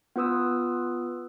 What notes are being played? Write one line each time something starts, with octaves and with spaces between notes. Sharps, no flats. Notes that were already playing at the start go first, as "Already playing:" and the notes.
B3 F4 B4 D#6 E6